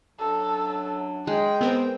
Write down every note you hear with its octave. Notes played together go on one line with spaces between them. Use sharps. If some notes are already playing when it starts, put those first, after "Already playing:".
F#2 F#3 D4 A4
G#3 G5
B3 C4 A#4 B4